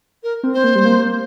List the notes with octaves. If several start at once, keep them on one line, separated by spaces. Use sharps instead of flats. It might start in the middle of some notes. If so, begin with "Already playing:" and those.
A#4
C4
C5
A#3
G3
A#3